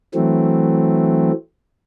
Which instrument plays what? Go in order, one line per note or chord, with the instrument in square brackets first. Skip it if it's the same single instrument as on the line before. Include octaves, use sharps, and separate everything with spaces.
[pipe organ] E3 F#3 A3 C4